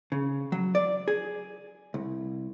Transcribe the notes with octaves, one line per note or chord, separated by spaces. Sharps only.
C#3
F#3
D5
G#4
C2